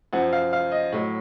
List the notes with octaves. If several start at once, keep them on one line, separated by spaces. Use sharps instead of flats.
F#2 F3 F#5
F5
F5
D#5
A2 F#3